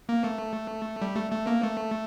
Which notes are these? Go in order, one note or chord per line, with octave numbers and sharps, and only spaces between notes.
A#3
A3
G3
A3
A3
A#3
A3